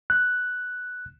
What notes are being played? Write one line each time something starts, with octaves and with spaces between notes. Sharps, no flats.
F#6